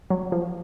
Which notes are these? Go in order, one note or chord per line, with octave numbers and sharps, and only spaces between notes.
F#3
F3